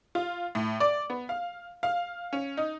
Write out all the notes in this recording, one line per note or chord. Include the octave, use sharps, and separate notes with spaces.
F4
A2
D5
B3
F5
F5
C#4
D#4